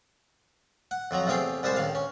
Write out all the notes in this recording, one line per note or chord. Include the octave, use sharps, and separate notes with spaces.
F#5
F2 F3 F#3 A#5
E2 C3 A3 G#4 F5 G5
C2 G3 G#3 C5 A5
C#2 D#3 F5
C#4